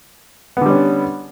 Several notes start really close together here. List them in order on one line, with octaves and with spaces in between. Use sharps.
B3 D3 G3 C#4